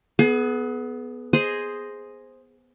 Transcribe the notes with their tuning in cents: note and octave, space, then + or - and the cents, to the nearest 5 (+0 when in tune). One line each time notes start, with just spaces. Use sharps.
B3 +0 G#4 +35
G#4 +0 C5 +0 D#5 +0